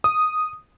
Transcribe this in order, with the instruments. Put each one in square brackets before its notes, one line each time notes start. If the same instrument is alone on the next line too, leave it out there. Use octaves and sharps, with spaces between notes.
[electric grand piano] D#6